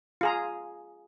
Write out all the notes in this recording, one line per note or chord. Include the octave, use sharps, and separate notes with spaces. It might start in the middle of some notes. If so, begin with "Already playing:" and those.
F4 G#4 A#5